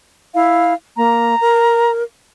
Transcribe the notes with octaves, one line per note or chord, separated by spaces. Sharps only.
E4 F5
A#3 A#5
A#4